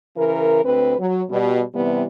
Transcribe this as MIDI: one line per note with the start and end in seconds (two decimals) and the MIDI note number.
0.16 0.60 49
0.16 0.60 52
0.16 0.60 70
0.64 0.94 38
0.64 0.94 60
0.64 0.94 71
0.98 1.22 54
1.30 1.60 47
1.30 1.60 55
1.74 2.04 48
1.74 2.04 52
1.74 2.04 55
1.74 2.04 59